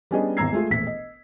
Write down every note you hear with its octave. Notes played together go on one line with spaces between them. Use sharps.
G3 B3 C#4 D4 G#4 D#5
G#1 E2 A#5 E6 G#6 C7
G#3 A3 F4 G#4
E1 A#1 A3 B6
D#5